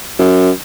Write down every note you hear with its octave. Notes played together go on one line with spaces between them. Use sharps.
F#2